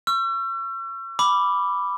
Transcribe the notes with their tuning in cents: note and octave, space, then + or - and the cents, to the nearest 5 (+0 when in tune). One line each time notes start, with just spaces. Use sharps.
C#6 +0 E6 +45
B5 +0 D6 +0